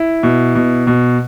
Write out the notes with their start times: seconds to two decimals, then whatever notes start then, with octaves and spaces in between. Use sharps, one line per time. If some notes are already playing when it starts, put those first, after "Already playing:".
Already playing: E4
0.23 B2
0.55 B2
0.87 B2